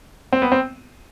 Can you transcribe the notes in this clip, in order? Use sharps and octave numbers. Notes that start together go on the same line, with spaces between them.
C4
B3
C4